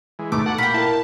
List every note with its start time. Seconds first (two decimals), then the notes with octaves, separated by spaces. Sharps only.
0.19 E3 G#3
0.32 D#2 G#2 B2 A3 D6
0.46 F#4 A4 F#5
0.58 A#2 F5 G5 B5
0.74 E4 A#4 A5